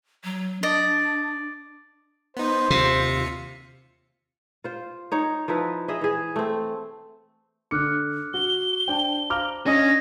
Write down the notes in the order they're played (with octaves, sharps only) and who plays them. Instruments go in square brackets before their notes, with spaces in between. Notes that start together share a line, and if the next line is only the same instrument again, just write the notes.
[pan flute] F#3
[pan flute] D4 [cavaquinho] D5 D#5
[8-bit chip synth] B3 D#4 [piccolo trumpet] C5
[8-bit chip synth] D#2 F4 C#7 [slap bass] C3
[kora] F4 C5
D#4 C#5
F3 D#4 E4 B4
G#4 D#5 E5
E3 G#4
A3 C4
[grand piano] D3 C#7 [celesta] D6 F6 F#6
[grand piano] F#4 [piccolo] G7
[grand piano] D4 G5 [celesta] C5 D5 A5
[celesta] C5 F5 [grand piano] A#5 D6 F6
[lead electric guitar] C#4 [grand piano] D4 D#5 D#6 [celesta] G#5 [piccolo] A#6